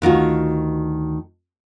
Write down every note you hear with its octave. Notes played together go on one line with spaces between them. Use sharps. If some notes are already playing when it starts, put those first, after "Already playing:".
D2 D#3 F4 F#4